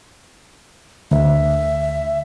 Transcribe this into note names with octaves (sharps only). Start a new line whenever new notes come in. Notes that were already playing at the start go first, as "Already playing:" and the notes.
D2 E5